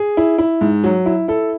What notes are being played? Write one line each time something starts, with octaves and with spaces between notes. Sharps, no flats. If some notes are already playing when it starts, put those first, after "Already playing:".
Already playing: G#4
E4
E4
G#2
F#3
E4
E4 A4